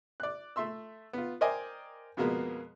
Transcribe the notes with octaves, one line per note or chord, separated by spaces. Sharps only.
D5 F#6
A3 E5 C6 E6
B3 F4
A#4 C5 D5 D#5 G5 G#5
F2 B2 G#3 A#3 B3